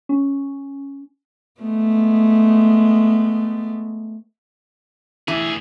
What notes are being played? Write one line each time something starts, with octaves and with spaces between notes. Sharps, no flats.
C#4
G#3 A3 B3
D2 E3 G#4